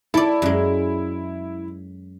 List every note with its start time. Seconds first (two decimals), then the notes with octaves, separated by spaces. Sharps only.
0.14 E4 A4 D5
0.42 F#2 G#3